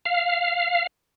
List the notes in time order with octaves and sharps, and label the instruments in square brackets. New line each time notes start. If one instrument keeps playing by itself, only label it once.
[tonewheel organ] F5